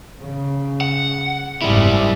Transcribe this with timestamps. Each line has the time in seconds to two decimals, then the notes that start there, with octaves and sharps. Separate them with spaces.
0.20 C#3
0.81 F#5
1.62 F#1 G#2 G3 E4